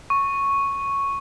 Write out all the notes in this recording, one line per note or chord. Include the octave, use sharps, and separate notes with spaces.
C#6